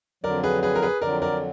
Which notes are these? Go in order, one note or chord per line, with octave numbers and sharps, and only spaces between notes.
F2 D3 F#3 A#4 D5
G#4 B4
G#4 B4
A#4
G#4 B4
F2 D3 F#3 A#4 D5
A#4 D5